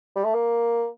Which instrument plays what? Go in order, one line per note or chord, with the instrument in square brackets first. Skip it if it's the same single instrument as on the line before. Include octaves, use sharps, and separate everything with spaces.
[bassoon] G3
A3
A#3